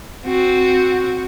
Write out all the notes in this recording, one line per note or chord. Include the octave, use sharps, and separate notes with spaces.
C4 F#4